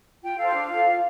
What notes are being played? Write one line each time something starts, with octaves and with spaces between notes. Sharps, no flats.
F4 G5
A4 C5 F5
D4
F4 A4 C5
F4